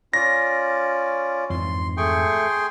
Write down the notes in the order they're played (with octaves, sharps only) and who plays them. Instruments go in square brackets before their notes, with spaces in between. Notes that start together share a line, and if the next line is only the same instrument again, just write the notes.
[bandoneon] C#4 F4 D5 [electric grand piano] A#6
[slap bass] F2 G#2 E3 [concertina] C6
[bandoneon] A3 C#6 [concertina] G#4 G5 C6